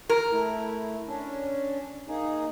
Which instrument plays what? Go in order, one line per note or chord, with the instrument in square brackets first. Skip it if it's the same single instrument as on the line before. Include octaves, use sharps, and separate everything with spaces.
[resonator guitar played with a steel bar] A#4
[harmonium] A3 E4
C#4 D4
A#3 D#4 G#4